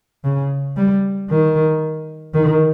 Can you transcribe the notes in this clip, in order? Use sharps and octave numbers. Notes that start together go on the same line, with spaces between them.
C#3
G3
D#3
D#3